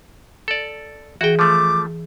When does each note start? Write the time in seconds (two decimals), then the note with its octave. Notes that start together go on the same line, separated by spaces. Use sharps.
0.48 A4 D5
1.21 E3 F#4 G#4 G5
1.39 F3 A3 D6